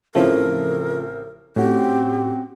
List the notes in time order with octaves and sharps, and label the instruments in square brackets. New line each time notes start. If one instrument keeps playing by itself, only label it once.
[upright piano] A1 C4 E4 [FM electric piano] C#3 F3 A3 [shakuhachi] A#4
[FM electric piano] A2 [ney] C4 [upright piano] C#4 F#4 [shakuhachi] G4